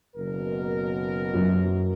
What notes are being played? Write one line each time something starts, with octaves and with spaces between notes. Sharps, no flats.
F#1 B2 A#4
F#2 F#3